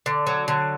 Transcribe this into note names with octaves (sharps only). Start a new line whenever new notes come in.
D3
F#3
D3